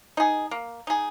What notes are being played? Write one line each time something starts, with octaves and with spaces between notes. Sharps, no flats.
D#4 G#4
A#3
D#4 G#4